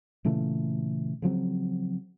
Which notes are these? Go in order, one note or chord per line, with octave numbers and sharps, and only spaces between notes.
A#2 C#3 E3 A3
C#3 F3 F#3 C4